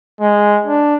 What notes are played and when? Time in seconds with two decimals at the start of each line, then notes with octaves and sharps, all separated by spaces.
0.21 G#3
0.66 D4